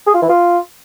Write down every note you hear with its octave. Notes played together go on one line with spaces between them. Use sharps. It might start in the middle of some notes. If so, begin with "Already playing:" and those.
G#4
F4
E3
F4